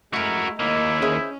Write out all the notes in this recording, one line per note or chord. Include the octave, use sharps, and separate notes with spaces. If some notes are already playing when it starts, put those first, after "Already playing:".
G#3 A3 E4 F#4 A#4 A#5
D#2 A#3 E4 D#5
C#4 G#4 C5 E5